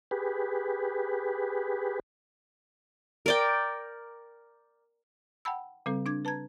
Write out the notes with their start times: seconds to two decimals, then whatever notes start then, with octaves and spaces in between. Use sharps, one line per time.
0.11 G4 G#4 B4
3.26 A#4 D5 G5
5.45 F#5 G5 A5 B5 E6
5.86 C#3 G3 C4 A4
6.06 D4 D6 G#6
6.25 B4 A5 A#5 G#6